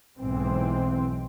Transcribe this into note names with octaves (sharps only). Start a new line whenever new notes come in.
B1 G#2 E3 C4